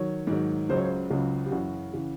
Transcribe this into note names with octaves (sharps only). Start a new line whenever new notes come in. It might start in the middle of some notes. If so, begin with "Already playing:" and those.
Already playing: D#3 F#3 C#5
G#2 D#3 F#3
C#2 C#3 F#3 C5
C#5
C5
C#2 C#3 F#3
G4
F#2 C#3 E3 F#4
C#3 E3